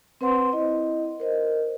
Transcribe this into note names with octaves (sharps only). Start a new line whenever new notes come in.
C4 B4 C5 F#5 C6
E4 D#5
A#4 C5 D#5